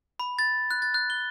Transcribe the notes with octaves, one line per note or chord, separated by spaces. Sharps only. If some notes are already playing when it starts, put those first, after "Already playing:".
B5
A6
F#6
A6
F#6
G7